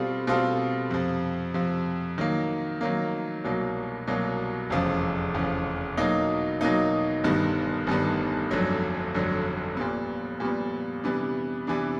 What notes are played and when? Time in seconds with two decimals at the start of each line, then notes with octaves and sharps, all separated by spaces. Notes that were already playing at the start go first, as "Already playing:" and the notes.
Already playing: B2 G3 C4 F4 A4
0.27 B2 G3 C4 F4 A4
0.90 F2 C3 F3
1.54 F2 C3 F3
2.18 D#3 F#3 A#3
2.81 D#3 F#3 A#3
3.44 C2 B2 F#3 A#3
4.07 C2 B2 F#3 A#3
4.70 F1 E2 C#3 F3
5.34 F1 E2 C#3 F3
5.97 B2 F#3 A#3 D#4
6.61 B2 F#3 A#3 D#4
7.24 G1 G2 D#3 G3 B3
7.87 G1 G2 D#3 G3 B3
8.51 G1 F2 D3 F#3 A3
9.14 G1 F2 D3 F#3 A3
9.77 A#2 G3 B3
10.40 A#2 G3 B3
11.04 C3 E3 G3 B3 D4
11.67 C3 E3 G3 B3 D4